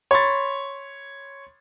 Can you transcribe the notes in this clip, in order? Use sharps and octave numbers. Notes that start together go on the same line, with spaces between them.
C#5 B5 C6 A6